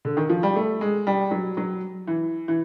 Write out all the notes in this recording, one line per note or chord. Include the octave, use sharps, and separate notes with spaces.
D3
D#3
F3
G3
A3
G#3
G3
F#3
F#3
E3
E3